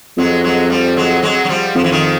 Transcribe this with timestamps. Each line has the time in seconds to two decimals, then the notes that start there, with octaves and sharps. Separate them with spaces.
0.18 F2 F#3 G#3
0.44 F#3 G#3
0.70 F3 G3
0.97 F#3 G#3
1.23 F#3 G#3
1.45 F#3
1.49 F3 G3
1.76 F2 F3
1.84 E3
1.91 D#3 F3